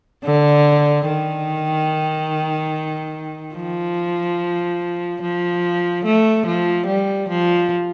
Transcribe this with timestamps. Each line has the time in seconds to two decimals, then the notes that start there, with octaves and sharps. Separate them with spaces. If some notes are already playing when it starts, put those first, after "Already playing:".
0.25 D3
1.07 D#3
3.55 F3
5.22 F3
6.05 A3
6.46 F3
6.87 G3
7.29 F3